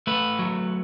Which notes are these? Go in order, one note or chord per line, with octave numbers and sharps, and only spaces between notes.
A3 B4
F#3